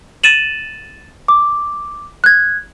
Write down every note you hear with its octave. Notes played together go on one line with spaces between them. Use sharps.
A6 D#7 E7 F#7
D6
F#6 G#6